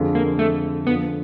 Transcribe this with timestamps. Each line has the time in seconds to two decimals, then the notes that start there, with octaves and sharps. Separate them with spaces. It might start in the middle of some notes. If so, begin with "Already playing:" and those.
Already playing: F2 D3 F3 G#3
0.15 A#3
0.39 A3
0.86 F2 D3 F3 B3